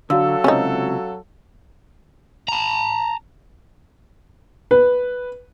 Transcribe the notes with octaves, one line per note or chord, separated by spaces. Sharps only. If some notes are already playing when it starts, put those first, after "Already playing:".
D3 F#3 F#4 A4 F5 E6
C#2 C3 C#4 D#4
A5 A#5
B4